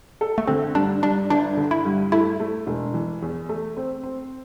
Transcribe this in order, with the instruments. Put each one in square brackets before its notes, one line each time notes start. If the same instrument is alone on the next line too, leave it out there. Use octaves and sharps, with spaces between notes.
[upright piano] A4
[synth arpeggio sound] A3
[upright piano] D3 [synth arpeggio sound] C4
[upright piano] G2 [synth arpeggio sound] D4
[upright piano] G2 [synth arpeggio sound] D4
[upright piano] G1 [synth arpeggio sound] D4
[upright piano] D3
[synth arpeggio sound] E4
[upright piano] G2
[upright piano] A3 [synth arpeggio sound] E4
[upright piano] A3
E1
E3
E2
A3
C4
C4